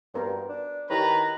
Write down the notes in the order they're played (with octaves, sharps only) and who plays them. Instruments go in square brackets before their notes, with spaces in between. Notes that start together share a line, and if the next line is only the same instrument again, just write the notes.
[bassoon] G2 [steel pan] B3 A#4 C5
[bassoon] D4
[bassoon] D#3 [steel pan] E4 G4 C#5 [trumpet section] B4 A#5